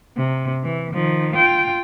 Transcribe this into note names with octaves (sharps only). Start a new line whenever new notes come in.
C3
E3
D#3 F3
F4 G5